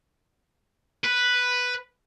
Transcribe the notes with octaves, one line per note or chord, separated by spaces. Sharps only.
B4